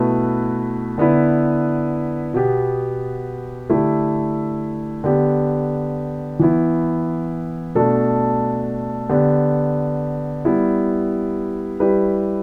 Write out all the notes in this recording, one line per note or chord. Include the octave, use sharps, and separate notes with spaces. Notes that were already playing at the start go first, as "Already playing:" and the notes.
Already playing: B2 A3 E4 B4
D3 B3 E4 B4
B2 B3 G4
D3 A3 E4 G4
D3 B3 G4
E3 B3 E4
B2 A3 D4 A4
D3 B3 G4
G3 B3 E4
G3 E4 G4 B4